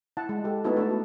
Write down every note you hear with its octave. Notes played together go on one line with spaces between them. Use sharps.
E4 F#5 A5
G#3
G4 A4
A3 B3 D#4 E4 F#4 A4
A3 D4 A4
F#4